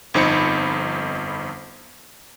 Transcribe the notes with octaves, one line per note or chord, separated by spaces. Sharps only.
G1 F2 D#4 C5 B5 C#7